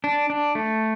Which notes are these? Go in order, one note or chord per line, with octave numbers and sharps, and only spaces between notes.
D4
D4
A3